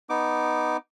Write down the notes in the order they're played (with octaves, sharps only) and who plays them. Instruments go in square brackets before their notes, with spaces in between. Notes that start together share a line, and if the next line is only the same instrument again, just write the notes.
[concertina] B3 D#4 D6